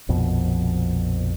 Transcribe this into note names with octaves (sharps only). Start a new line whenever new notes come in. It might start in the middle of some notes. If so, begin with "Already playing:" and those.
A#1 F2 B2